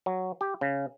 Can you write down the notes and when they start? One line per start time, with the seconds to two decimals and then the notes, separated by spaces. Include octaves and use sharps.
0.06 F#3
0.41 G4
0.61 C#3